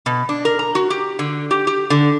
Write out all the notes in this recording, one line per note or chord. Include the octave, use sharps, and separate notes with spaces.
B2
D4
A#4
A#5
F#4
G4
D3
G4
G4
D3